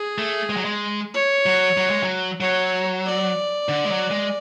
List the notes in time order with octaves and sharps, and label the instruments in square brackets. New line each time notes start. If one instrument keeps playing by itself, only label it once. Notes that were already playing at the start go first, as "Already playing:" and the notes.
Already playing: [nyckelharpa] G#4
[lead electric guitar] A3
G#3
F#3
G#3
[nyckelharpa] C#5
[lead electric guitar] F#3
F#3
G#3
F#3
[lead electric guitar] F#3 [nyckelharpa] C#5
[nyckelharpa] D5
[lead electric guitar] D3
G#3
F#3
G#3